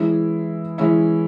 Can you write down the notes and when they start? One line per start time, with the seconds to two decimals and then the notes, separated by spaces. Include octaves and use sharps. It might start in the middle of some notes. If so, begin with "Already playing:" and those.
Already playing: E3 G#3 C#4 E4
0.78 E3 G#3 C#4 E4